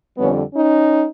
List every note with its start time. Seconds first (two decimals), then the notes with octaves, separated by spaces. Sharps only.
0.18 F2 D3 G3 B3 C#4
0.52 C#4 D#4